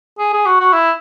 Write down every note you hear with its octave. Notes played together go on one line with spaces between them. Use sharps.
G#4
G#4
F#4
F#4
E4